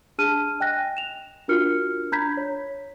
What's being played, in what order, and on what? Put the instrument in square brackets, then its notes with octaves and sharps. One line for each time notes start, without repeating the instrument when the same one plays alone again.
[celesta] D4 G#4 A5 F6 D#7
D#5 G5 G#5 F#6 A#6
E7 F7
D4 F4 F#4 A#4 F6 C#7
D4 A#5 B5 G6 G#6 B6
C#5